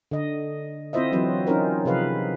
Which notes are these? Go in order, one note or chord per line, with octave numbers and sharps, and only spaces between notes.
D3 D#5
C4 E4 F4 C5 D#5 E5
E3 F#3 C4 B4
C#4 D#4 F4 A#4 C5
C3 F3 G#4 B4 F5